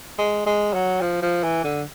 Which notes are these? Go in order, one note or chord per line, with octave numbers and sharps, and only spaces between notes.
G#3
G#3
F#3
F3
F3
E3
D3